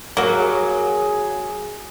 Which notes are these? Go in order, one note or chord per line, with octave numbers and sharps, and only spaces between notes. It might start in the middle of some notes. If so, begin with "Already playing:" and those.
F#3 A#3 F#4 G#4